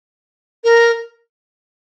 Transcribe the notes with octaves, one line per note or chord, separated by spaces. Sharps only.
A#4